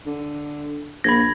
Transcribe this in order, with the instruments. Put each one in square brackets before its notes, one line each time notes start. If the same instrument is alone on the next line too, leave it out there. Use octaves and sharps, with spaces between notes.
[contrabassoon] D3
[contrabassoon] A#1 [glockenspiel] B5 G#6 [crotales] A#6